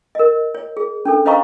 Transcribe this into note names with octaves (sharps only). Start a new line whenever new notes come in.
A#4 D#5
C#5
G#4
C#4 D4 A4
C#4 C5 D#5 F5 A#5 C#6